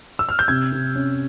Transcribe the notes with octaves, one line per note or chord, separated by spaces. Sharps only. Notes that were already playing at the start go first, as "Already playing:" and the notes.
E6
F6
G6
C3 G#6
C3
C#4